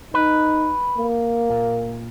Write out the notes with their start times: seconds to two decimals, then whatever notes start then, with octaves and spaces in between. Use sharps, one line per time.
0.14 D#4 B4
0.98 A#3
1.50 A#2